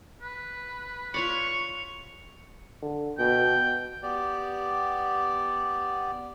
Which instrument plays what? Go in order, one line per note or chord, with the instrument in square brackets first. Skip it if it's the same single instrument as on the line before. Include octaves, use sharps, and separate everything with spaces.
[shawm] B4
[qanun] F4 C#5 D5 [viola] C#6 [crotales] C#7 F7
[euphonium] D3
[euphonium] B2 [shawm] G5
[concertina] B3 G4 D5